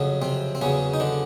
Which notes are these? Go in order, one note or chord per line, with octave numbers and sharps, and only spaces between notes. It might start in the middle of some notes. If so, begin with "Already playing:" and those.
Already playing: F2 C#3 F#3
C3 C4
C4
E2 C#3 F#3 C#4
D#4
D3 D4